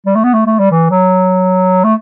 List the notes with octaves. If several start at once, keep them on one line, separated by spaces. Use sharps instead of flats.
G3
A3
B3
A3
A3
G3
E3
F#3
A3